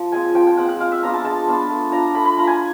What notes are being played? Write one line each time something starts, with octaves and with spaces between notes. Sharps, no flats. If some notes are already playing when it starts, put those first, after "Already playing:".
Already playing: F3
G#3 C4 F4 G#5
F3 G5
G5
G#3 C4 F4 F#5
F#5
G#3 F5
E5
B3 D4 F4 A#5
A5
G#3 A5
B3 D4 F4 B5
A3
D4 F4 A#5
A3 B5
B5
D4 F4 A#5
G#5